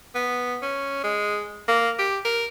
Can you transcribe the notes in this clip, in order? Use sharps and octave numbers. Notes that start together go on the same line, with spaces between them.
B3
C#4
G#3
A#3
G4
A#4